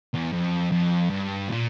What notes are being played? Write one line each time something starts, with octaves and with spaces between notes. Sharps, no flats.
E2
F2
F2
G2
A#2